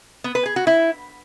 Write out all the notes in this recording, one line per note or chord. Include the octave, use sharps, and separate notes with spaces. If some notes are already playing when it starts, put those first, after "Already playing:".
B3
B4
G#4
F#4
E4